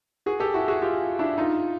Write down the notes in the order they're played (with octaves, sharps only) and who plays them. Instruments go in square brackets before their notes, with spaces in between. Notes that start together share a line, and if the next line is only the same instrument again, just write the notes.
[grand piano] F#4 G#4
G4 A4
E4 F#4
F#4 G#4
F4 G4
D4 E4
D#4 F4